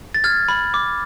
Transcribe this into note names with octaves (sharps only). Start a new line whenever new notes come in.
A6
F6 G#6
B5
D6